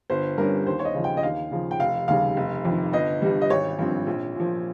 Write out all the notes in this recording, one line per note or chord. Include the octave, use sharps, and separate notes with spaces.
G1 C5
G2 G3 C#4 A#4
D#2 C5
C#5
D#5
C#3 F3
G5
D#5
D#2 F5
C#3 F3
G5
F1 F5
D#2 C#3 G3 F5
F1
F2 D#3
G1 D#5
G2 G3
D#5
G#1 C#5
G2 F3 C4
A#1
A#2 F3